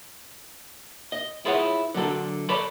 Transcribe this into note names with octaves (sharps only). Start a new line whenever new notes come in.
D#5
E4 F4 G#4 B4 C#5 F#5
D3 F#3 D4 A4
A4 B4 C#5 D5 A5 B5